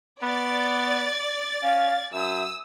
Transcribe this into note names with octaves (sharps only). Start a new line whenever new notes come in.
B3 D5 A6
C#4 F5
F#2 E5 D#6 E6